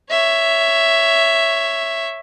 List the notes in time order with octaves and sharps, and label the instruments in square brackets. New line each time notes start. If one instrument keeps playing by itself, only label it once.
[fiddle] C#5 E5